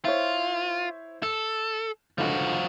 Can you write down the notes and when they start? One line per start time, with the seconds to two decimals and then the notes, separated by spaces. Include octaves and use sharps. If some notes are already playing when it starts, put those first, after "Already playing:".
0.05 E4 F4 C5 C#5
1.23 A4 E7
2.18 F1 C#2 D3 F3 F#4